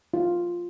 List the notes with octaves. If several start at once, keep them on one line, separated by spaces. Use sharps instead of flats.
F4